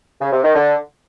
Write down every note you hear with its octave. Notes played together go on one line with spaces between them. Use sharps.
C#3
C3
D#3
D3